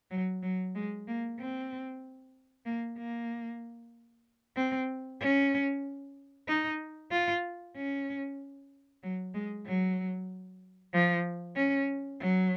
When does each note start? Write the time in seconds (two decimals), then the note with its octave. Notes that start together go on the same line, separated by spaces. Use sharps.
0.11 F#3
0.43 F#3
0.75 G#3
1.07 A#3
1.39 C4
2.66 A#3
2.98 A#3
4.56 C4
5.20 C#4
6.48 D#4
7.12 F4
7.76 C#4
9.03 F#3
9.34 G#3
9.67 F#3
10.94 F3
11.56 C#4
12.20 F#3